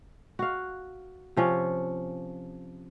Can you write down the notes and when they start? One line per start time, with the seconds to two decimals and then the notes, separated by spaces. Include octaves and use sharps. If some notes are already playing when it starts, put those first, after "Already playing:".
0.39 F#4 F5
1.37 C3 F3 C#4